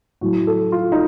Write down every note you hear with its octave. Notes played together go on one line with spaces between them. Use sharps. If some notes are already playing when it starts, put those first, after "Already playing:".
A2 F#3 F#4
A4
F4
D#4